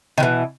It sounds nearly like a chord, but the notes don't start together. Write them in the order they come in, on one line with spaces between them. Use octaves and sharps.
D#3 B2 E3